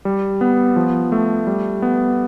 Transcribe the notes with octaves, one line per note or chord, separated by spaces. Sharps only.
G3
B3
F3
A3
G3
B3